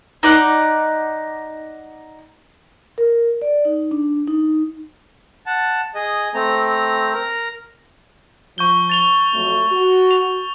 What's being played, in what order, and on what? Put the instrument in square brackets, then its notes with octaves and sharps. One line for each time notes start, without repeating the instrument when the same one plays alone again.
[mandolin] D#4 D5 F#5
[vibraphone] A#4
D5
D#4
D4
D#4
[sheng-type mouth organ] F#5 A5
G#4 D#5
A3 C4 A#5
A#4 A#5
[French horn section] F3 [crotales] C#6 G6 G7
[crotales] A6 F7 G7
[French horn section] F2 F#3 A3
F#4
[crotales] F7